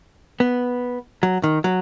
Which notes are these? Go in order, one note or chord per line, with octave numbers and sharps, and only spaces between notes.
B3
F#3
D#3
F#3